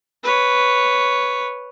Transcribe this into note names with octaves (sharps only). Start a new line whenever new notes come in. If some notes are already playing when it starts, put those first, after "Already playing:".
B4 C#5